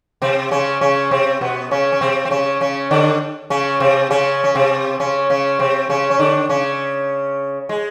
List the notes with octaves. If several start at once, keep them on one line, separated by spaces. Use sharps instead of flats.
C3 C4
C#3 C#4
C#3 C#4
C3 C4
B2 B3
C#3 C#4
C#4
C3 C4
C4
C#3 C#4
C#3 C#4
D3 D4
C#3 C#4
C3 C4
C#3 C#4
C#4
C3 C4
C#3 C#4
C#3 C#4
C3 C4
C#3 C#4
C#4
D3 D4
C#3 C#4
G#3